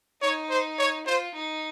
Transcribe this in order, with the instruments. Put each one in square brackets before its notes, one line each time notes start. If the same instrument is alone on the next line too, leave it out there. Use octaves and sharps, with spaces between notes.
[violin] D#4 [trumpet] C#5
[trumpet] C5
C#5
[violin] F4 [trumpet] C5
[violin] D#4